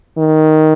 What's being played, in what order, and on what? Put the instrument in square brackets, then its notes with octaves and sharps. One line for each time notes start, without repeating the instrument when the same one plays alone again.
[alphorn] D#3